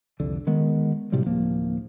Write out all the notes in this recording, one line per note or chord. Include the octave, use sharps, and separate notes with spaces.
C2 F2 D3
D#3 G#3 B3
A2 C3 F#3 G3
D1 F3 A#3